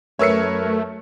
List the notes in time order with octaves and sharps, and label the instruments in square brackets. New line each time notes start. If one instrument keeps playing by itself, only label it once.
[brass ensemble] F#2 [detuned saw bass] A3 [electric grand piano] A#4 B4 E5 [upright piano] C#5 E6 C#7